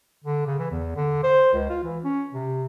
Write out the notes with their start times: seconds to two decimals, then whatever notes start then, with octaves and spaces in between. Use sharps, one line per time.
0.24 D3
0.47 C#3
0.59 E3
0.71 E2
0.96 D3
1.24 C5
1.53 C#2
1.70 F4
1.84 E3
2.04 C#4
2.33 C3